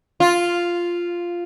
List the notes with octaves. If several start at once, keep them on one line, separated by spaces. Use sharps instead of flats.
F4